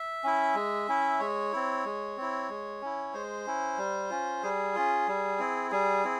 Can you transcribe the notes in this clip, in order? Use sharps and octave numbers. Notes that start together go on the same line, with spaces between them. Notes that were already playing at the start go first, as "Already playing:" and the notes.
Already playing: E5
C#4 E4
G#3
C#4 E4
G#3 C#5
C4 E4
G#3
C4 E4
G#3
C#4 E4
G#3 C5
C#4 E4
G3
C#4 F4
G3 G#4
C#4 F4
G3
C4 E4
G3 G#4
C4 E4